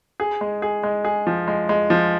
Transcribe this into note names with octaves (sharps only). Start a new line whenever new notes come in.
G#4
G#3
G#4
G#3
G#4
F3
G#3
G#3
F3